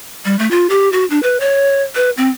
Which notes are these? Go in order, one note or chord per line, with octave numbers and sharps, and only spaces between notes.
G3
A3
F4
G4
F#4
D4
B4
C#5
B4
C4